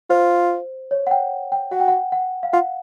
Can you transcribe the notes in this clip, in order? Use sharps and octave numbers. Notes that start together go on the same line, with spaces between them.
F4 C5
C#5
F#5
G5
G5
F#4 F#5
G5
F#5
F#5
F5
F4 F#5